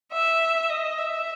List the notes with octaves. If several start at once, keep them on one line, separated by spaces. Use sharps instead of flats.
E5
D#5
E5